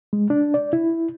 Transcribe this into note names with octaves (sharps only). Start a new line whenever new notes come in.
G#3
D4
D5
E4